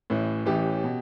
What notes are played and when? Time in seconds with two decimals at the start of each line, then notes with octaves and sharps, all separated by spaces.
0.10 A1 A2 E3
0.46 A1 A2 E3 G4
0.84 B2